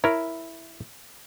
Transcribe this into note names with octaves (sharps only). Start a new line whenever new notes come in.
E4 A#4 C#5